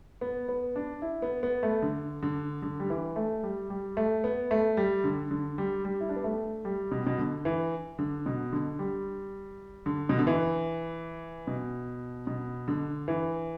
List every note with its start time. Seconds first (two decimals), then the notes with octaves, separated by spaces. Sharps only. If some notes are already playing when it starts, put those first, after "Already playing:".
0.21 B3
0.49 B3
0.76 D4
1.02 E4
1.22 B3
1.43 B3
1.63 A3
1.82 D3
2.23 D3
2.62 D3
2.80 G3
2.90 E3
3.16 A3
3.43 G3
3.70 G3
3.97 A3
4.24 B3
4.51 A3
4.77 G3
5.04 D3
5.31 D3
5.58 G3
5.85 G3
6.01 E4
6.09 D4
6.16 B3
6.24 A3
6.65 G3
6.91 B2
7.07 B2
7.18 D3
7.45 E3
7.99 D3
8.26 B2
8.53 D3
8.79 G3
9.86 D3
10.09 B2
10.18 D3
10.27 E3
11.47 B2
12.27 B2
12.68 D3
13.08 E3